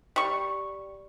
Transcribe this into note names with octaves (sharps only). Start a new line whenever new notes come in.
G3 C#6